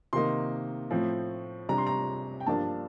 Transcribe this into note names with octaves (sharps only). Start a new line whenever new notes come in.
C3 D#3 A#3 D#4 C6
A2 F3 C4
C3 G3 D4 A#5
C6
A#5
G5
G2 F3 A#3 D4 A5